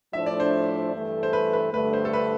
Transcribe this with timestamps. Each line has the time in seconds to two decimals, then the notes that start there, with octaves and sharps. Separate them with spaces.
0.13 A2 F3 A3 D4 E5
0.26 D5
0.40 C5
0.94 G2 E3 A3
1.23 C5
1.33 B4
1.53 B4
1.73 G2 D3 A3 B4
1.93 C5
2.05 A4
2.13 B4